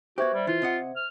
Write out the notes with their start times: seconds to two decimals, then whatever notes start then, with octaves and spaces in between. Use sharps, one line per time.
0.18 B3 F#4 G4 C5 E5 G#6
0.33 G3
0.47 E3 F4
0.62 C3 D#5 F#5
0.96 F6